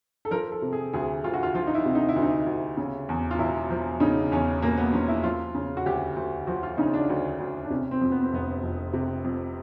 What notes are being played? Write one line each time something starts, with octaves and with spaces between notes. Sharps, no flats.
A4
F3 A#4
A4
C3
G#4
D2 G#4
D2 F4
F#4
F4
F3 F4
D#4
E4
C3
D#4
E4
D2
D#4
D2
C#3
E2
F4
E1 E4
F3
C#3 D#4
E2 C#4
E1 A#3
B3
F3 C#4
E4
F3 F4
C#3
F#4
D2 G4
D2
F3 F#4
F4
C#3 D#4
D4
D2
D2
D4
C3 C#4
C4
F2
B3
C4
F1 B3
F1
C3
F2